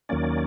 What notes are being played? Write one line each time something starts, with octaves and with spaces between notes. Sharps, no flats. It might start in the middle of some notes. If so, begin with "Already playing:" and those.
D#2 D#3 F#3 A#3 C#4 D5